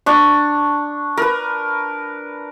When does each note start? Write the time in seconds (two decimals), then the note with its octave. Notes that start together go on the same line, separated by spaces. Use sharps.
0.06 D4 C#6
1.17 A#4 B4